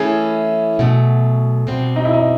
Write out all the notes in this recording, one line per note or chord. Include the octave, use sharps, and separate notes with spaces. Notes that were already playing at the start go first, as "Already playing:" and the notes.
Already playing: E3 A3 C#4 E4 G#4
B2 F#3 A3
B2 G3 C4
D#4
E4
D#4